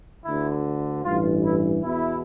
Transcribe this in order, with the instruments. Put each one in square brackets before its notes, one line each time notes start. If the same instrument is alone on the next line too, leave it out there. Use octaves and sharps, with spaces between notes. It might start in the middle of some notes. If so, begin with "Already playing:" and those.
[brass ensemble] D2 D3 E4
A1 G2 E3 F4
E4
E2 B2 E4